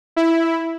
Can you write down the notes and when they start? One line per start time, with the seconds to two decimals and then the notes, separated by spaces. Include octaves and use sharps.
0.16 E4